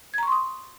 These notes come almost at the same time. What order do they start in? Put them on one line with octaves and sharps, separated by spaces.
G#6 A#5 C#6 C6 D#6